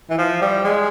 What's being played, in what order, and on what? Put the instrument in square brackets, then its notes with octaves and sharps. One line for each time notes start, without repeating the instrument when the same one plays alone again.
[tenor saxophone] E3
F3
G3
G#3